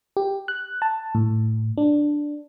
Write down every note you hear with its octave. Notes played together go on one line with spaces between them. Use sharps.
G4
F#6
A5
A2
D4